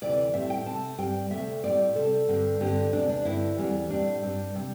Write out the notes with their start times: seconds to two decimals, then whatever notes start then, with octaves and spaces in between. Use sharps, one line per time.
0.01 D2 C3 E3 C4 D5
0.34 A2 G3 C4 E5
0.50 G5
0.66 C3 A3 C4 A5
0.98 G2 G3 C4 G5
1.30 D2 C3 A3 C4 E5
1.64 A2 G3 C4 D5
1.95 C3 G3 C4 A4
2.28 G2 D3 G3 C4
2.60 G2 D3 C4 G4
2.93 E2 C3 A3 C4 D4
3.09 D4
3.25 G2 D3 A3 C4 E4
3.58 E2 E3 G3 C4
3.90 A2 G3 C4 D4
4.22 G2 G3 C4
4.54 C3 G3 C4